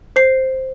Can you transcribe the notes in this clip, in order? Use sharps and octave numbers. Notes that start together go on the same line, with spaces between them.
C5 C7